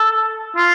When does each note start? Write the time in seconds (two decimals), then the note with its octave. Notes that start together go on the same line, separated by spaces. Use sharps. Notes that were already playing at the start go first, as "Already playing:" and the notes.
Already playing: A4
0.57 F4